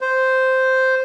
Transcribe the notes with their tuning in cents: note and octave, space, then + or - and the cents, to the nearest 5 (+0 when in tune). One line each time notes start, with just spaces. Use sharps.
C5 -5